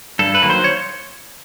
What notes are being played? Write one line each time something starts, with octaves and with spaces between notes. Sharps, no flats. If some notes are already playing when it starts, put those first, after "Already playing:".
G2 A4
B4
D#3 F#3 A#3
C5
C#5